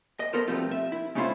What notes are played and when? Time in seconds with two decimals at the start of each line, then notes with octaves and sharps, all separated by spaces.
0.20 D#5
0.33 B3 A4 A#4 C5
0.47 B2 F3 G3 A3 C4 F4
0.71 E5
0.92 E4
1.15 G#3 A3 C#4 E4 F4 C5